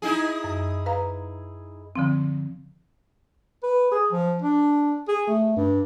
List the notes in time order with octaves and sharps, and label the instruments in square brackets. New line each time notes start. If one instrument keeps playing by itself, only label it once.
[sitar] D#4 E4 G#4
[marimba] F#2
B4 F5 A#5
D3 F3 C4
[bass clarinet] B4
G#4
F3
D4
G#4
A3
G2